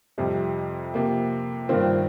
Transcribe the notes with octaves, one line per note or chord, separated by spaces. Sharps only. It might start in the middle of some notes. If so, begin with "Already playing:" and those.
F2 C3 G3
C3 F3 A#3
G2 D#3 C4 F4